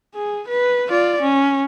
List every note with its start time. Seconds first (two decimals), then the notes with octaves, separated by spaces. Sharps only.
0.15 G#4
0.48 B4
0.89 F4 D5
1.21 C#4